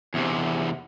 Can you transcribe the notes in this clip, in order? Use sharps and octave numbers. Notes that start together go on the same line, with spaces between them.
E2 C3